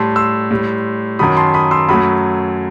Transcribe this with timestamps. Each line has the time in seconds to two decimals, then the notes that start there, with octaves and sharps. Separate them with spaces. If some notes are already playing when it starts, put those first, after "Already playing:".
Already playing: A2 G3 A5 C6
0.16 C6 E6
0.51 A2 G3
1.19 F#2 D#3 F#3 B5 D#6
1.37 A5 C6
1.54 B5 D#6
1.71 C6 E6
1.88 F#2 F#3 A3 B5 D#6